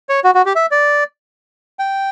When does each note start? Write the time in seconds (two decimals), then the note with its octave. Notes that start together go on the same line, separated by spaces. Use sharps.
0.09 C#5
0.24 F#4
0.35 F#4
0.46 G4
0.55 E5
0.71 D5
1.79 G5